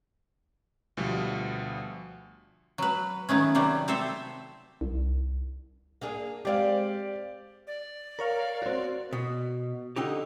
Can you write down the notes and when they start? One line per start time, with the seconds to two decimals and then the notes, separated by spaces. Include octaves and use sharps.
0.97 D2 B2 F3 G3
2.78 F#3 B4
3.29 D#3 A3 B3 C#4
3.55 C3 F#3 G3 G4
3.88 C4 A4 C5 E5
4.81 C2
6.01 A#3 D4 G#4
6.45 G#3 C4 G4 D5 F5
7.67 D5
8.19 A#4 C#5 F5
8.62 C4 F#4
9.13 B2
9.96 D3 D#4 G4